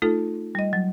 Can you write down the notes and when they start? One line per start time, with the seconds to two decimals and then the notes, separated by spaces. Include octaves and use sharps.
0.02 A3 D#4 F4 A4
0.55 G3 D#5
0.73 F#3